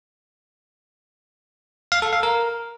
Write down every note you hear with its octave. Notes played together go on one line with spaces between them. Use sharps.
F5
A4
F5
A#4